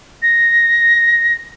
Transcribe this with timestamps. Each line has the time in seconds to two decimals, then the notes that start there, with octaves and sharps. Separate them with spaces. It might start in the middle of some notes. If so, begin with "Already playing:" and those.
0.22 A#6